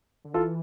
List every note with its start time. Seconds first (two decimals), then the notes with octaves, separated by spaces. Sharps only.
0.25 D3
0.34 E3 F4 A4